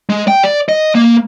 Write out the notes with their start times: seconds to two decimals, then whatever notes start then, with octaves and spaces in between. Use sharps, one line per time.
0.10 G#3
0.28 G5
0.43 D5
0.69 D#5
0.95 A#3